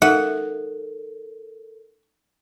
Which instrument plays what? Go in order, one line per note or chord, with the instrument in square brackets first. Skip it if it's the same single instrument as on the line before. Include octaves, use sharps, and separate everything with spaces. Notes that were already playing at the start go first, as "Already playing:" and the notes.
[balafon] D#4 [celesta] A4 A#4 [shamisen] E5 [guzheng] F#5